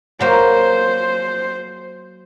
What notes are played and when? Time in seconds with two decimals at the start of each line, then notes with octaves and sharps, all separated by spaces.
0.20 F#3 A#3 C5